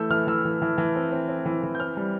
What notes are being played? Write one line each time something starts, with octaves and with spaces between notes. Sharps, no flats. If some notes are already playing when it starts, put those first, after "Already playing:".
Already playing: E3 A3 E6 G6
E3 F6
E3 E6
E3
E3
E3
C4
C4
C4
E3
E3
G6
C4 F6
G3